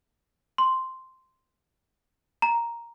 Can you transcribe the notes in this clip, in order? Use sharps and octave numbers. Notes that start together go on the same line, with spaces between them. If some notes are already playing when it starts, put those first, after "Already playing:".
C6
A#5